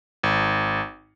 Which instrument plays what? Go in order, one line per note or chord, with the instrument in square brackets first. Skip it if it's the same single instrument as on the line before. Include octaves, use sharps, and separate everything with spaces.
[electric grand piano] G#1